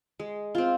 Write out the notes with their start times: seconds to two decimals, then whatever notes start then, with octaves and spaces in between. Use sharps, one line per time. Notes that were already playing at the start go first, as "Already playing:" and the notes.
0.19 G#3
0.55 C4 F4